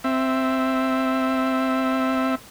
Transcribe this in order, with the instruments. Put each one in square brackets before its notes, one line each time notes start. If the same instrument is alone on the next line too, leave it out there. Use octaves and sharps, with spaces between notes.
[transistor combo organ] C4 E5